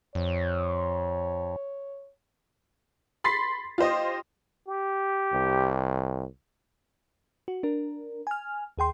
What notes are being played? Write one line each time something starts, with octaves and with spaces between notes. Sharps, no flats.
F2 C#5
B5 C6 A6 B6 C7
F4 G4 C5 D#5
G4
C2
F#4
D4 A#4
G#5 F6
D#2 G#4 G5 C6